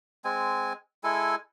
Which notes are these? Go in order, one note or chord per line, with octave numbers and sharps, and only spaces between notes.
G#3 C4 G#5
G#3 E4 A4 G#5